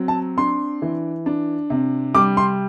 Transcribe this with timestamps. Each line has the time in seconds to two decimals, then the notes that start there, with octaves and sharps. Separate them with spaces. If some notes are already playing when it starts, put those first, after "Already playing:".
Already playing: F#3 C4
0.08 A5
0.38 D4 C6
0.82 E3
1.26 D4
1.70 C3
2.15 G3 D6
2.37 C6